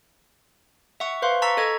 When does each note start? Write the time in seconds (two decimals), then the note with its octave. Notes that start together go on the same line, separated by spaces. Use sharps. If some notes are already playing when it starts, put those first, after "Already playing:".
1.00 E5 F#5 C#6
1.22 B4 C5 F5 C6
1.42 A5 A#5 C#6 E6 B6
1.57 A4 D#5 G#6